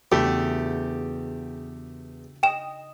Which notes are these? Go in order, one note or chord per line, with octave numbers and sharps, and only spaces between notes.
E2 C#3 A3 D4 F#4 G4
D#5 G5 E7